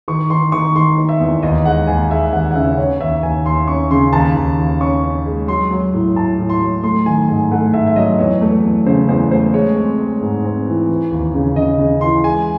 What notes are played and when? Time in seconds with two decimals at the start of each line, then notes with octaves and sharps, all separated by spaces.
0.08 D#3 C#6
0.30 D#3 C6
0.52 D#3 C#6
0.76 D#3 C6
0.98 D#3
1.09 E5
1.20 E2
1.43 D#2 D#5
1.65 G#3 F#5
1.87 D#2 G#5
2.11 G#3 E5
2.33 D#2 F#5
2.51 F#5
2.55 C#3 E5
2.78 C#4 C#5
3.00 D#2 E5
3.22 D#2 G#5
3.46 D#2 C6
3.68 C#4 C#6
3.91 C#3 C6
4.13 D#2 A5
4.35 D#2
4.59 D#2
4.81 C#4 C#6
5.03 C#4
5.26 G#3
5.48 F#3 C6
5.71 F#3
5.93 A2
6.16 A2 A5
6.39 A2
6.50 C6
6.60 F#3
6.83 A3 C6
7.06 D#3 G#5
7.28 G#2 G#5
7.51 A3 F#5
7.73 G#2 E5
7.87 E5
7.96 F#3 D#5
8.18 E2 C#5
8.41 A3
8.64 E2
8.86 C#3 C5
9.09 E2 C5
9.31 A3 C5
9.54 G#3 C#5
9.76 C4
9.99 G#3
10.21 G#2
10.45 C4
10.67 E3
10.89 E3
11.11 D#2
11.34 C#3
11.56 C#3 D#5
11.79 C#3
12.01 E3 C6
12.24 G#3 G#5